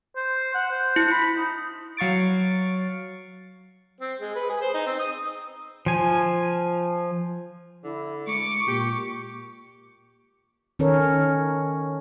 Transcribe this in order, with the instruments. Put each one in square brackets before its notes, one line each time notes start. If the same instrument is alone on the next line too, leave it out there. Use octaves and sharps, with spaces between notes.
[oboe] C5
F#5
C5
[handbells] E4
[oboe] B5
D#4
[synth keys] F#3 F5 C#6 A6 D7
[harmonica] C4
G#3
B4
G#4
C5
D#4
C4
D#6
[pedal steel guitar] F3 G#5
[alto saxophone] D3 [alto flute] E4
[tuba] G#3 [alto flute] C#6 [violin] D6 C#7
[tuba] A#2 [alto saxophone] G4
[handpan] D#3 C#4 A4 A#4 C#5